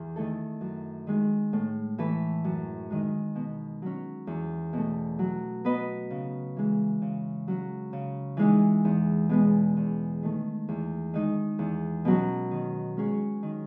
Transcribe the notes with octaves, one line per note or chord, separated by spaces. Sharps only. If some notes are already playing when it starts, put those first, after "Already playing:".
Already playing: E2
D#3 A3 E4 A4
F#2
D#3 G#3
A2
E3 A3 E4 B4
F#2
D#3 G#3
B2
F#3 C#4
E2
B2 A3
F#3
B3 F#4 B4 D#5
C#3
E3 G#3
C#3
F#3 C#4
C#3
E3 G#3 D#4 G#4
E2
B2 G#3 B3
E2
D#3 A3
E2
D#3 G#3 D#4
E2
B2 F#3 C#4
D#3
G#3 C#4 G#4 C#5
D#3